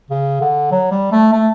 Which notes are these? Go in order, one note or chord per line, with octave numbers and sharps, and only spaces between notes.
C#3
D3
F#3
G3
A3
A3